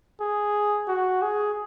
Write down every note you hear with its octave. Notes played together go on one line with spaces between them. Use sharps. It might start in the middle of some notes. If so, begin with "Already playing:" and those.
G#4
F#4
G#4